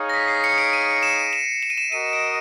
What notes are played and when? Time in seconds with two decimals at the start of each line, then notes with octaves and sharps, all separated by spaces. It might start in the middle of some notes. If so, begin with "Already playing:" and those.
Already playing: D#4 G#4 C#5 F5
0.09 A#6
0.14 B6
0.28 C7
0.44 C#7
0.58 D7
0.73 D#7
1.03 E7
1.33 E7
1.63 E7
1.70 D#7
1.78 E7
1.92 F#4 A#4 D#5 D#7
2.13 D7